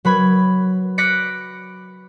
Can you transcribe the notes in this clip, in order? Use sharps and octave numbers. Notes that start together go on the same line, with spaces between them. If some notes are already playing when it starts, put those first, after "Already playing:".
F#3 B4 B5 G#6
D6 F#6 A#6 B6 C#7 D7